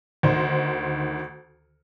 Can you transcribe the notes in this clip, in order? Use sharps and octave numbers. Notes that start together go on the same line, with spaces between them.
D2 D#3 C5